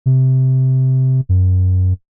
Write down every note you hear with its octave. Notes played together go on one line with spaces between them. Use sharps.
C3
F#2